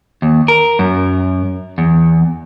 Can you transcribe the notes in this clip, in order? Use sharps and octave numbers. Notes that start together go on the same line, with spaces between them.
D#2
A#4
F#2
E2